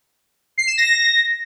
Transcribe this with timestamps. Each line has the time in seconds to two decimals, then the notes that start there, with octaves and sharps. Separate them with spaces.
0.58 C7
0.68 E7
0.78 A#6